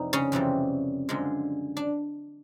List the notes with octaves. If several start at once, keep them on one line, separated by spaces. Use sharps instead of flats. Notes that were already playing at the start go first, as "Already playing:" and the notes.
Already playing: F2 C3 E3 G3 D#4
C#3 C#4
F2 C3 E3 G3
F#2 D3 F3 G#3
D4